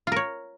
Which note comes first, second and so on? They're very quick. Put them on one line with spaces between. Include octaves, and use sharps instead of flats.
F4 A#4 C#5